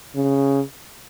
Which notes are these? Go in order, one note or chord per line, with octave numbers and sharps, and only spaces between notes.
C#3